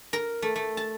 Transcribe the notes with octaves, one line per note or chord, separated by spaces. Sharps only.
A#4
A3
A3
A5